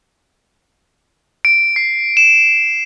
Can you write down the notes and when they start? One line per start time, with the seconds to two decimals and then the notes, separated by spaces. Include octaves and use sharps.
1.45 D7
1.76 C7
2.17 E7